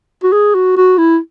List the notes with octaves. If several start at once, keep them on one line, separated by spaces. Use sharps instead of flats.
F#4
G#4
F#4
F#4
E4